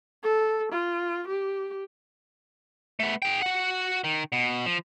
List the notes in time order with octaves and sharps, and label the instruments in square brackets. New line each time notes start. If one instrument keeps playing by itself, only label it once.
[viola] A4
F4
G4
[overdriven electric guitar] A3 B3
G#4 G5
F#4 F#5
D#3
B2
F3